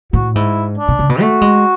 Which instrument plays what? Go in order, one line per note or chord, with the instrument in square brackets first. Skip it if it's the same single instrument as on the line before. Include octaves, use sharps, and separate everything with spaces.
[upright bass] A2 [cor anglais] F#4
[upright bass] G#2 [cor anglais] E4
[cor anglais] D4
[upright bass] B2
C#3
B2
[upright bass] A3 [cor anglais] F#4
[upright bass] G#3